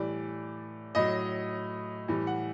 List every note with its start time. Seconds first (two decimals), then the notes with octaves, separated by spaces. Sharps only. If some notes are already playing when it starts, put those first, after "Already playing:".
Already playing: A2 E3 G3 D5
0.95 A2 F#3 D#5
2.08 A2 E3 G3
2.27 F#5